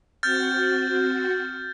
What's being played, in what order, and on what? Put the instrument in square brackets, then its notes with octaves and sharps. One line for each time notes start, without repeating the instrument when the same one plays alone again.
[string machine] C4 F#4 F#5 [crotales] F6 G6 A6